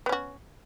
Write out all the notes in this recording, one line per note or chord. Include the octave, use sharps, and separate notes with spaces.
B3 C#4 F#4